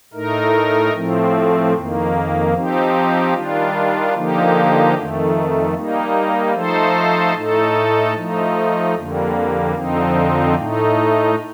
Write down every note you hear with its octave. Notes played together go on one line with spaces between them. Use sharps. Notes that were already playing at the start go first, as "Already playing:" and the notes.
A2 A3 D#4 A#4
A2 F3 A3 C4
F2 D#3 A#3
F3 C4 D#4 G4
D#3 G3 D4 F4
D3 F3 A#3 D#4 G4
F2 D#3 A3
G3 A#3 D#4
F3 A3 D#4 A4 C5
A2 A3 D#4 A4
F3 A3 D#4
F2 D3 G3 A#3
F2 D3 F3 C4 D#4
A2 A3 D#4